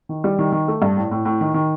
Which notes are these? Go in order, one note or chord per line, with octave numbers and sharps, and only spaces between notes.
D#3
G3
D#3
D#3
A3
G2
A2
A2
A2
D#3
D#3